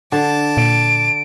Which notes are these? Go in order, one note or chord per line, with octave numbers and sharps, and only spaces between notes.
D3 A5 D6
A#2 D7